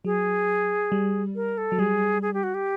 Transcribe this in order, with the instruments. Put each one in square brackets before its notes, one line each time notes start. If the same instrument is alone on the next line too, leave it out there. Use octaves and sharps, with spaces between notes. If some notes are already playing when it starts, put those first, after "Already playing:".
[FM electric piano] F#3 [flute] G#4
[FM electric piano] G3
[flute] A#4
A4
[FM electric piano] F#3
[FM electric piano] G3 [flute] G#4
[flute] G#4
G4
F#4
G4